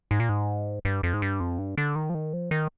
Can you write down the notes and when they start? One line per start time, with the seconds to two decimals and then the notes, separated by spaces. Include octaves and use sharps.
0.11 G#2
0.20 A#2
0.29 G#2
0.85 G2
1.03 F2
1.14 G#2
1.22 G2
1.40 F2
1.59 G2
1.78 D3
1.95 D#3
2.10 F3
2.15 D#3
2.33 F3
2.51 D#3